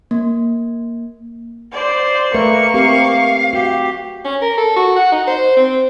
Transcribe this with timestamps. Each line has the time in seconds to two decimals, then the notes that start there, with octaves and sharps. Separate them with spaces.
0.11 A#3
1.72 C5 D5
2.34 A3 A#3 B4 E5 C#6
2.74 C4 G4 F5
3.53 F#4 G4
4.25 C#4
4.42 A#4
4.58 A4
4.77 F#4
4.96 F#5
5.12 D#4
5.28 C5
5.57 C4